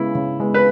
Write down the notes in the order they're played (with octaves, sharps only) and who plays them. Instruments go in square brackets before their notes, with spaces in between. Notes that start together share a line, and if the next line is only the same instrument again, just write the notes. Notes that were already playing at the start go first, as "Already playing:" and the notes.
Already playing: [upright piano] C#3 G#3 B3 [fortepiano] E4
[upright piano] C#3
G#3 B3
[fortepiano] B4